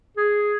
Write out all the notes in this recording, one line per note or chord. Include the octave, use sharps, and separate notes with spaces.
G#4